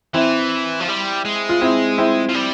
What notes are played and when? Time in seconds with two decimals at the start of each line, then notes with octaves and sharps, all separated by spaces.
0.14 E3 C4 E4
0.80 F3
0.88 G3
1.25 G#3
1.49 F4
1.61 C4 E4
1.98 C4 E4
2.29 F3
2.35 G3